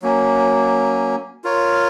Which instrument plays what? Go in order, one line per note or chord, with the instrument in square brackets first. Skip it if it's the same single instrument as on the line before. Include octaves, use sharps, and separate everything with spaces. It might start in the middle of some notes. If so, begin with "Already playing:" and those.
[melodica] F#3 A#3 C#4
F4 A#4 C#5